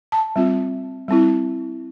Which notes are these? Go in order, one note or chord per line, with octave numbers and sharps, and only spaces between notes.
A5
G3 C4 F4
G3 C4 E4